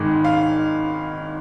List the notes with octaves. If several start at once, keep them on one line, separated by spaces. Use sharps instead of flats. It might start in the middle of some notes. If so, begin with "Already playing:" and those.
Already playing: G#1 G#2 D#3 G#3
F5